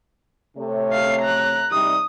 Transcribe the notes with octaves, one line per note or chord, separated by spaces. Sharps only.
C3 A3 C#5
F5 C7
A#5 F#6
C3 G3 D#4 D#6